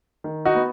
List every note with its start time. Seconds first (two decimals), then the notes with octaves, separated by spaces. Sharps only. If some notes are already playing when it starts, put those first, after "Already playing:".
0.24 D#3
0.45 D#4 F#4
0.55 B3